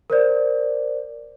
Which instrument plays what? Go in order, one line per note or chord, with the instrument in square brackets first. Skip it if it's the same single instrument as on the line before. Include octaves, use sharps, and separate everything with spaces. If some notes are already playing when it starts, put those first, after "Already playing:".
[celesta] A#4 C5 D5